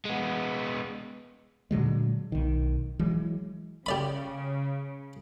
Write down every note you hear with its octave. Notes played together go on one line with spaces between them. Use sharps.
G#3 B3
A#2 D3 F#3 G#3
B1 D#3
E3 F#3 G#3
C#3 G4 D5 B5